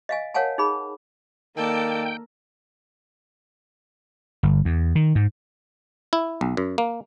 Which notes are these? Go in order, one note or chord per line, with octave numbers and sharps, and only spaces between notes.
D#5 F5 G#5
A#4 C#5 F5 F#5 G#5 A5
D#4 G#4 B5
D#3 A#3 A4 D5 G5
G1
E2
D#3
G#2
E4
B1
F#2
A#3